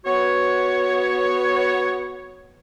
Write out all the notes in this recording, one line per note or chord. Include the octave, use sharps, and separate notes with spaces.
B3 F#4 C#5